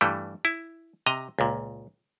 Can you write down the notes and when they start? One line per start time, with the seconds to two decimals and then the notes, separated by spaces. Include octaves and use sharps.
0.01 G2 E3 G3 A3
0.45 E4
1.06 C3 D#5 A#5
1.39 C#2 A#2